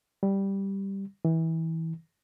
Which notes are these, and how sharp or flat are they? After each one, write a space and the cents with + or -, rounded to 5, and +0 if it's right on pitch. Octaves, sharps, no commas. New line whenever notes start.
G3 +0
E3 -25